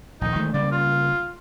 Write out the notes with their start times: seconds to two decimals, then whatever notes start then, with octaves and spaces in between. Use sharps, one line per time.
0.21 A#1 D#2 D#4
0.35 D#3 G#3 A3
0.54 C#3 G3 A#3 D5
0.72 F4